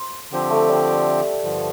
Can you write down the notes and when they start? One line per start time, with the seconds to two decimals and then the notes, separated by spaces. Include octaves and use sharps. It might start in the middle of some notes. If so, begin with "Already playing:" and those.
Already playing: C5
0.31 D3 F3 C4 G4
0.50 A3
0.69 G3
1.44 G2 D3 F3